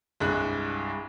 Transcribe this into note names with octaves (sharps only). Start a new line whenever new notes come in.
C2 G2 G#3 F#6